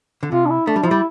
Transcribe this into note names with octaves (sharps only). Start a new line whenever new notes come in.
D3
C3 F4
D4
E4
A3 D4
G3
F3
G3 E4